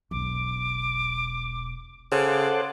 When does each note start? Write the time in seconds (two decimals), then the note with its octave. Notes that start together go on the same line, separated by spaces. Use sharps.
0.11 E1 B1 D6
2.12 C#3 A4 C5 F#5 D6